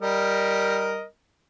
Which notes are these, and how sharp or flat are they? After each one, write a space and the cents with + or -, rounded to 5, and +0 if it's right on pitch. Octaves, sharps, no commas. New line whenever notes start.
G3 +0 A#4 +5 D#5 +0